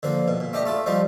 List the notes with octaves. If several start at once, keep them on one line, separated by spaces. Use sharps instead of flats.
D3 F3 A#3
B2
A#2
A3 D4 G4 D#5
A3 F4 A4
F3 G3 D#4 F4